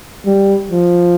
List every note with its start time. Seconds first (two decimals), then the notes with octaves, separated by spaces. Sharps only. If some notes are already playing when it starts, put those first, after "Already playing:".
0.26 G3
0.71 F3